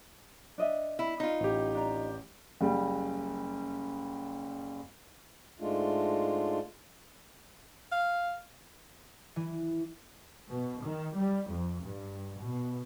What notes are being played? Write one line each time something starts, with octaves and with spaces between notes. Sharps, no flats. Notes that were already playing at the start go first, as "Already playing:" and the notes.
D4 D#5 E5
E4
D#4 F4
A1 G4
D4 A#5
F#1 G3
G#2 G#3 A3 D4 F4
F5
E3
B2
D#3
G3
F2
G2
B2